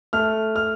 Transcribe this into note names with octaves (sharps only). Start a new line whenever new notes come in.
A3 F6
F6